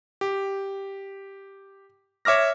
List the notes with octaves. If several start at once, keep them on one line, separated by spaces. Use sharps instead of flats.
G4
C#5 E5 D6 F6 A#6